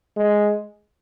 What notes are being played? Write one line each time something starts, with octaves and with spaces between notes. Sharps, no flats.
G#3